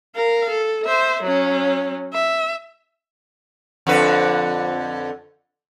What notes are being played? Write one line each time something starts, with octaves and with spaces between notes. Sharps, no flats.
A#4 F5
A4
C5 E5
F#3 C#4
E5
F2 D3 B4